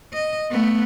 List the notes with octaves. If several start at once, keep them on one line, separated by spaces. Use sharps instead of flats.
D#5
A3 B3